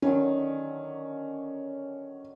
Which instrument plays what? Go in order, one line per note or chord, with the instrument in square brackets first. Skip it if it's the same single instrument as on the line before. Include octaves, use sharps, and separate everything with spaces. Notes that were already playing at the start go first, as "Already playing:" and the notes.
[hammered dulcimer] D3 D#3 F#3 [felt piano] C#4